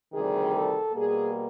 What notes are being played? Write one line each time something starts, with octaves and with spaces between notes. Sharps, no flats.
D2 C3 D#3 G3 G#4
A4
B2 G3 A#3 G#4